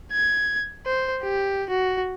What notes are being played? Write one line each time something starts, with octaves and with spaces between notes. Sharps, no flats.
G#6
C5
G4
F#4